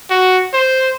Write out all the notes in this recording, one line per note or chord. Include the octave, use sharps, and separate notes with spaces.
F#4
C5